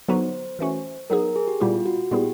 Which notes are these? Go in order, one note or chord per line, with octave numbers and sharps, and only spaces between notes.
D3 F#3 B3 D#4 F#4 C5
E3 A3 C#4 F#4
F#3 B3 D#4 G#4 A#4
G#4
G4
A#2 G3 B3 E4 F4 G4
F#4
A#2 G3 B3 E4 G4 G#4